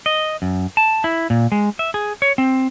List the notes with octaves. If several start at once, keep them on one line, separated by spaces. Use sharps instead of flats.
D#5
F#2
A5
E4
A#2
G#3
E5
G#4
C#5
C4